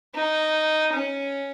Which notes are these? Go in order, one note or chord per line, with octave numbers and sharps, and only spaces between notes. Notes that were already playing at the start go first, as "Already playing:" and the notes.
D#4
C#4